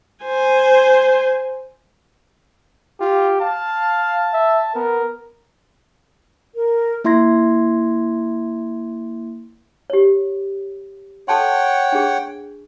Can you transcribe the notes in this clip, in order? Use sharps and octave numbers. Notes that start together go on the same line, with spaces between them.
C5 G#5
F4 G4
F5 A5
E5
B3 A#4
A#4
A#3 E4 E5 C6 G#6 A#6
G4 C#5
A4 C#5 F#5 G5 A5 C6
D4 G#4